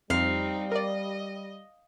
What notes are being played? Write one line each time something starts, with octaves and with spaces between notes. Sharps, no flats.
F2 G3 C4 D#4 F5
A#4 D5 D#5